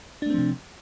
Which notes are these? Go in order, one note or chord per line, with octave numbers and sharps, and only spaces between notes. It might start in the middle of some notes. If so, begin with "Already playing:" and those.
C3 F3 A3 C4 D4